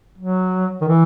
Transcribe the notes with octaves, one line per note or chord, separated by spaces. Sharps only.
F#3
D#3
E3